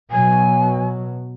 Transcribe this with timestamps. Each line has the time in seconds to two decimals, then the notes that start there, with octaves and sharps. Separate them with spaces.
0.11 B2 F#3 G#5